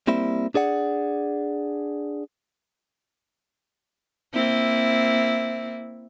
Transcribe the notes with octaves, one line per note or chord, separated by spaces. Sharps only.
G3 A#3 C4 E4
D4 G#4 D5 F#5
A#3 C4 E4